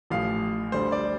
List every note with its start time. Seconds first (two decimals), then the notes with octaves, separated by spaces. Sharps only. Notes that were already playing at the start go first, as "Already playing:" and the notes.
0.10 A1 A2 F3 F5
0.72 D2 D3 G3 C5
0.92 D5